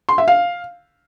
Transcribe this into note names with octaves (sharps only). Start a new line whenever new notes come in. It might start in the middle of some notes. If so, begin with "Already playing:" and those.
C6
E5
F5